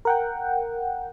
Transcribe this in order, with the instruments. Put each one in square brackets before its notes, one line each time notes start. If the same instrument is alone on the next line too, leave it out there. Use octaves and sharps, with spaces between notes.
[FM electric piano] A#4 F#5 G5